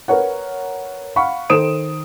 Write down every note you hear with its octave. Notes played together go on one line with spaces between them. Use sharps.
A#4 B4 C#5 F#5
F5 F#5 B5 C#6
D#3 A4 C5 D#6 D7 E7